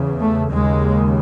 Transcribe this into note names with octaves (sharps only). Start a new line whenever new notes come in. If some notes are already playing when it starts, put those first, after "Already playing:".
Already playing: E2 C#3
A3
D#2 C#3 G#3